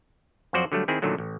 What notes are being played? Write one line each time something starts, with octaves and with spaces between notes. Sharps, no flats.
F2 F3 F#3 F#4 C5 D5
D3 F#3 G3 A3
D#3 C4 E4 G#4
A#2 D3 D#3 F#3 A3
A1